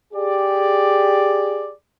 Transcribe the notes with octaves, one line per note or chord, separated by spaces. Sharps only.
G4 G#4 D5